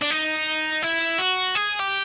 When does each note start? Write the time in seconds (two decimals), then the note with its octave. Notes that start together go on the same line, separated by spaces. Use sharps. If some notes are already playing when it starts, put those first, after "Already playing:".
0.02 D4
0.10 D#4
0.82 E4
1.18 F#4
1.55 G#4
1.79 G4